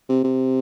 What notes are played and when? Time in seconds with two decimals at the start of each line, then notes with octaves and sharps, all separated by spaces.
0.09 C3
0.24 C3